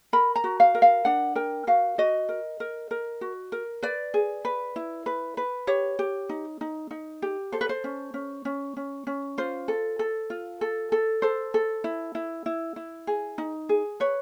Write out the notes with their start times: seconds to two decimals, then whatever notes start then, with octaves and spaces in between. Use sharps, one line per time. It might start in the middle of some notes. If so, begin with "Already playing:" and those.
0.13 A#4 B5
0.36 A#5
0.44 F#4
0.60 F5
0.75 A#4
0.82 F5
1.05 D4 F#5
1.35 A#4 G5
1.67 F#4 F5
1.98 F#4 D#5
2.29 A#4
2.60 A#4
2.91 A#4
3.21 F#4
3.52 A#4
3.83 B4 D5
4.14 G#4
4.45 B4
4.76 E4
5.06 B4
5.37 B4
5.67 G4 C#5
5.99 G4
6.29 D#4
6.61 D#4
6.91 D#4
7.22 G4
7.52 A4 C5
7.61 B4
7.69 C5
7.84 C#4
8.14 C#4
8.45 C#4
8.77 C#4
9.07 C#4
9.38 F4 C5
9.68 A4
9.99 A4
10.30 F4
10.61 A4
10.92 A4
11.22 A4 C5
11.54 A4
11.84 E4
12.15 E4
12.46 E4
12.76 E4
13.07 G#4
13.38 D#4
13.69 G#4
14.00 B4 C#5